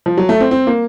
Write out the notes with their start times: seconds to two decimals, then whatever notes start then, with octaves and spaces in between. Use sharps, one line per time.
0.06 F3
0.18 F#3
0.29 A3
0.40 C4
0.51 C4
0.67 A#3